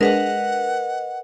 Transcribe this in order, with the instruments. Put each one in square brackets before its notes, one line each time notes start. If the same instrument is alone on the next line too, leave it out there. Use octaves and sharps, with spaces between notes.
[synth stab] G#3 D4 G#4 [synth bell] A#4 B4 D#5 [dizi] F#5